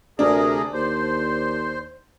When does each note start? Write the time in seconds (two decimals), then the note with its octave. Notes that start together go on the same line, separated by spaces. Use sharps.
0.19 D2 C3 D4 G#4 A#4
0.73 D#2 C5